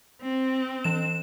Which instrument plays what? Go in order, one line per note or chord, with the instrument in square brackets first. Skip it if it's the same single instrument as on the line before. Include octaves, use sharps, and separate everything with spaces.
[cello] C4
[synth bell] E3 E7